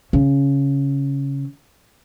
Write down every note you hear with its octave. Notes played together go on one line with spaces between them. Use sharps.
C#3